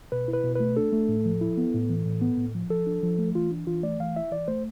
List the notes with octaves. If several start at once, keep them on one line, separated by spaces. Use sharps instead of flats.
B2 B4
E4
B4
B2
A3 B4
D4 A4
A3
A2
F3
E4
B3
A2
E3
A2
B3
A2
F3
F3 A4
D4
F3
A3
E3 F4
D4
E3 F4
A3 D5
E3 F5
E4 E5
E3 D5
A3 C5